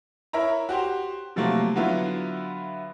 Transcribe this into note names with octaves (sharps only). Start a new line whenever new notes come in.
E4 A#4 C#5 E5 A#5
F#4 G4 C5
C3 F3 F#3 A3 A#3
D3 F#3 B3 E4 F4